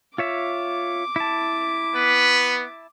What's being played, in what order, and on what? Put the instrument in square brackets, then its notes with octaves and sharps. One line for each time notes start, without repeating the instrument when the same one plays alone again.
[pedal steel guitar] F4 C#5 E5 [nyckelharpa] D6
[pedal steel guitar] E4 A5
[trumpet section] B3 B4